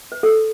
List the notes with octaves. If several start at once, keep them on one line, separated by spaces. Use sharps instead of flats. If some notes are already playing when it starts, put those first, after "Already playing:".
B4
A4